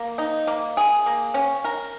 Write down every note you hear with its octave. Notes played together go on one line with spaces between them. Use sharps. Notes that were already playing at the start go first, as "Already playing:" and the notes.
Already playing: A#3
D#4
A#3
G#4
A#3
C#4
A#4